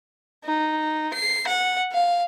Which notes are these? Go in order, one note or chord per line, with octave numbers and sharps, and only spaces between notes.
D#4
C7
F#5
F5